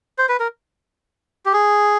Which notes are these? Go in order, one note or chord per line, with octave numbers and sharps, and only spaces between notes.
C5
B4
A#4
G4
G#4